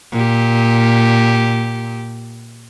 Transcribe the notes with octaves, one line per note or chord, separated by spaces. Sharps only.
A#2 G4